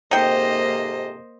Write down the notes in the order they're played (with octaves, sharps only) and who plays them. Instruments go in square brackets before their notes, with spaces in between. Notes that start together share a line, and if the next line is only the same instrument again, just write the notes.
[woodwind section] F2 G#2 C3 [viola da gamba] A#3 C5 D#5 [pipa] D#4 G5